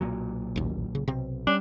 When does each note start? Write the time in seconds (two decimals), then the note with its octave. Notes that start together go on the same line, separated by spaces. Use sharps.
0.01 B1 A#2 F#3
0.56 A1 D#2
0.95 C#3
1.08 B1 C3 C4
1.47 G3 C#4 D4